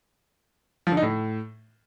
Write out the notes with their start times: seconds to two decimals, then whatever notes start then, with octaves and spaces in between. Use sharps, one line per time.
0.87 F3
0.92 D3
0.97 D#4
1.02 A2